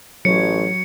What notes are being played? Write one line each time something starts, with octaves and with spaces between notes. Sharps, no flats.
A1 F#3 C#5 C#7